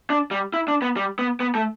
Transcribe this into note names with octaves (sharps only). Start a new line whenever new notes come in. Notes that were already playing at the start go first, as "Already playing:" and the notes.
D4
G3
E4
D4
B3
G3
B3
B3
A3